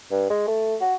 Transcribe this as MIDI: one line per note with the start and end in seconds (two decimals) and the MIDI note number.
0.11 0.26 43
0.30 0.46 56
0.48 0.76 57
0.81 0.95 66